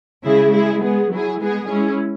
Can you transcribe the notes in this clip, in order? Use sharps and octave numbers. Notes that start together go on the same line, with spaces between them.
C#3 G#3 E4 G#4
G#3 E4 G#4
G#3 B3 G#4
F#3 E4 G#4
G#3 B3 G#4
G#3 C#4 E4 G#4